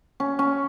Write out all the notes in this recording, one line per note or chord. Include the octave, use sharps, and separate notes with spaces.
C#4
C#4